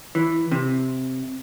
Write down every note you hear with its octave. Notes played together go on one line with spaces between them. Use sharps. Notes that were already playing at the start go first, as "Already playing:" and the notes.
E3
C3